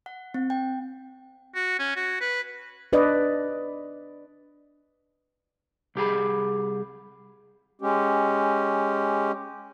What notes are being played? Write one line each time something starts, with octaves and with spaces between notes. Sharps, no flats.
F#5
C4
G5
F#4
C#4
F#4
B4
D4 B4 D5 D#5
C2 G4 G#4 B5
G#3 C#4 G4